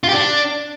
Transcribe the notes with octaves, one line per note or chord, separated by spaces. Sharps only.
F4
G4
D4